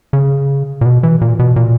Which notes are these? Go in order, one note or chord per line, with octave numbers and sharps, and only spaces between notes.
C#3
A#2
B2
E3
A#2
B2
A#2